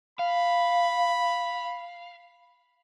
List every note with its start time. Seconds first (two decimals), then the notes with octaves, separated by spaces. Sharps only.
0.19 F5 B5